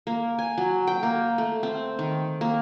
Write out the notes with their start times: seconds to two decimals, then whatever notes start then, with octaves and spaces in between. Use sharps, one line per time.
0.07 A#3
0.38 G#5
0.58 F#3
0.87 G5
1.03 A#3
1.38 A3
1.63 C4
1.99 D#3
2.41 A#3